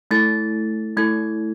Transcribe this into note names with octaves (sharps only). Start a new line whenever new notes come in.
A3 E4 A4 A6
A3 E4 A4 G#6